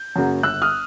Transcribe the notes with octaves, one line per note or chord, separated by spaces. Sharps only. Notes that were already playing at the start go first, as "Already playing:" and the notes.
Already playing: G6
F#2 C#3 F#3 A#3
G1 E6 F#6
D#6 F6